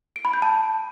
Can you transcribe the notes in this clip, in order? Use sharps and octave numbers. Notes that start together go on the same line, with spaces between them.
D7
B5
G6
A5